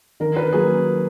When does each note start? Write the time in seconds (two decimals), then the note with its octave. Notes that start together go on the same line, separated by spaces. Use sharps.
0.20 D#3 A#4
0.37 B4
0.53 F#3 A#3 G#4